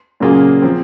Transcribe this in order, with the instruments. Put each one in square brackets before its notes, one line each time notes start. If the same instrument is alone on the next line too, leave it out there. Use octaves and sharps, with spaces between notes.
[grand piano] A#2 F#3 A#3 F4 G#4 [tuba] C#3
[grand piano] F3 C4